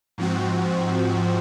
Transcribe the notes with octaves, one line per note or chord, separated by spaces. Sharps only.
G#2 F3 C4 F#4